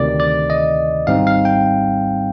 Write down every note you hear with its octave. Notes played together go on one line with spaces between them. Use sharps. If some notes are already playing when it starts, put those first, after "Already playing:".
Already playing: D2 C3 D#3 D5
D5
D#5
G#1 G#2 G3 C4 D#4 F5
F5
G5